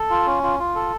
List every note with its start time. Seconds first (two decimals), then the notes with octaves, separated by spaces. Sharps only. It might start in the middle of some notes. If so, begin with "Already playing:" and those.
Already playing: A4
0.10 F4
0.26 C#4
0.43 F4
0.59 F4
0.75 A4